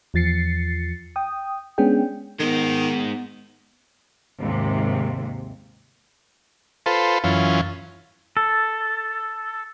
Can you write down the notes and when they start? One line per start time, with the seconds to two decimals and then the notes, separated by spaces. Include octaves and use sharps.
0.14 E2 F3 A6 C7 C#7
1.16 G5 D#6
1.78 G#3 B3 C#4 D4 G#4 G5
2.40 D#3 G#3 B3 D#4
4.40 D#2 G#2 C3
6.86 F4 A4 B4 C5
7.24 F#2 E3 C#4 F4
8.37 A4